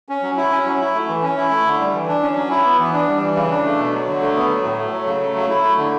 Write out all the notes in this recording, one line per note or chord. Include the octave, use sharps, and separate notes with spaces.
C#4
F#3
E4
C#4
F#3
E4
A3
E3
C#4
E4
A3
D3
G3
E3
D4
C#4
F#3
E4
B3
E3
D4
G3
E3
C#3
D4
A3
B2
F#3
D3
A3
B3
F#3
A2
A3
F#3
C#3
A3
F#3
E4
A3
D3